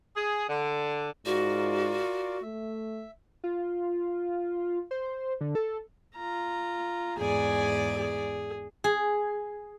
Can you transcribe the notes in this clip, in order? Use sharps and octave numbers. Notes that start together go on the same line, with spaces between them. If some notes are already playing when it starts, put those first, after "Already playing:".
G#4
D3
G#2 F4 F#4 A#4 D5
A3 E5
F4
C5
D3
A4
F4 A#5
E2 G#2 G#4 D5 G#5
G#4
G#4